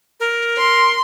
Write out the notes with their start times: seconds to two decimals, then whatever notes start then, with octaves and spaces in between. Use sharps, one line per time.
0.20 A#4
0.58 C6